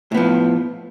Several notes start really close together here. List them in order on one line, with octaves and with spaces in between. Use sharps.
A2 B3 F3